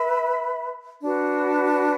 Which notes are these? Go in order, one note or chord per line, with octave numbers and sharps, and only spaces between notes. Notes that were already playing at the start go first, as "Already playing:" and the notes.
Already playing: B4 E5 B5
D4 F#4 B4